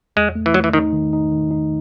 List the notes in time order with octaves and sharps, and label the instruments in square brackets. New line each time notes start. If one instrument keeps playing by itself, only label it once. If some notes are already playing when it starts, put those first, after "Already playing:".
[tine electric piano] E2 [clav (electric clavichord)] G#3
[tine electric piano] A3
[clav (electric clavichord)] E3
[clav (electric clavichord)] F#3 [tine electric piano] A3
[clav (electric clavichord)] E3
[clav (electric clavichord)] D#3 [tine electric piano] D#4
[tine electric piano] D#3
D#4
D#3
D#4